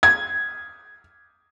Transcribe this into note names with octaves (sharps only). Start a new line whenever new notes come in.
G#6